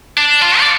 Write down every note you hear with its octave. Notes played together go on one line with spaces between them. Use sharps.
D4
F4
D5